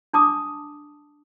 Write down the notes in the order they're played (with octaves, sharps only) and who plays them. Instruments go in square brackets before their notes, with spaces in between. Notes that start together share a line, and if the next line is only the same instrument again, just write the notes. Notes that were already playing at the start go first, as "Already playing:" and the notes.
[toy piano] D4 A5 D6 D#6